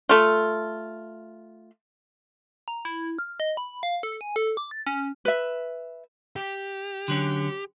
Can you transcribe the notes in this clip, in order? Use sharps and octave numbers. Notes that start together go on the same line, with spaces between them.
A3 F4
A#5
E4
F6
D#5
B5
F5
A4
G#5
A4
D6
A6
C#4
B4 E5
G4
D3 F#3 C#4